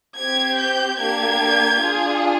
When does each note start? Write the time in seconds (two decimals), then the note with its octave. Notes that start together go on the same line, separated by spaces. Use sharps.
0.17 C4 G4 G#6
0.58 G6
1.00 A#3 D4 G4 G#6
1.81 D4 F4 G#4